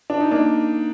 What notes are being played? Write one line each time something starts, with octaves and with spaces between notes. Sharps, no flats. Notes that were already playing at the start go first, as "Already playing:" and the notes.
D4
D#4
A#3 D4